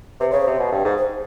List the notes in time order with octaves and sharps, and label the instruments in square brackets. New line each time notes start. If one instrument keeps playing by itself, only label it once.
[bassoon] C3 [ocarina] B4
[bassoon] C#3 [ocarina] C#5
[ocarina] C5
[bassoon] C3
B2
G2
G#2
[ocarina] C5